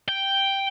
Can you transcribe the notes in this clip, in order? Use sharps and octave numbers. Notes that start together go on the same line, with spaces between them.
G5